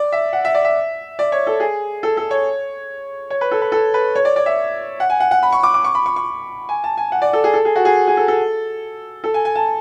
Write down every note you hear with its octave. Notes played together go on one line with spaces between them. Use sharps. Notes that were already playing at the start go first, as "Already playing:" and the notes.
Already playing: D5
E5
F#5
E5
D5
E5
D5
C#5
A4
G#4
A4
A4
C#5
C#5
B4
A4
B4
A4
B4
C#5
D5
D5
E5
F#5
G#5
F#5
F#5
B5
C#6
D6
D6
C#6
B5
C#6
C#6
G#5
A5
G#5
F#5
D5
A4
G#4
A4
G#4
F#4
G#4
G#4
A4
A4
A4
G#5
G#5
A5